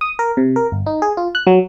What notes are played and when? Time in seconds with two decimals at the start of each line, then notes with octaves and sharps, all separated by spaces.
0.01 D#6
0.19 A#4
0.37 C3
0.56 A#4
0.72 G1
0.86 D#4
1.02 G#4
1.17 F4
1.35 F#6
1.47 F#3